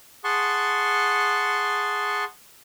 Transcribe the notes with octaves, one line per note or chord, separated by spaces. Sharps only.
G#4 F#5 A5 C6 C#6